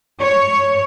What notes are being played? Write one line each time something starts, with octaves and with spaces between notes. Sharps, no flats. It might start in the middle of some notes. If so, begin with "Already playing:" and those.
C#5